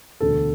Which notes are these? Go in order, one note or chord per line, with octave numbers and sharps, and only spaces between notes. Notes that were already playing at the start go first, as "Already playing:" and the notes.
E1 D2 D3 A4